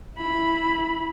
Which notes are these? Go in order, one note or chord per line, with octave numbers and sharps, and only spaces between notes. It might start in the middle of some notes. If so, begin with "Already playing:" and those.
E4 B5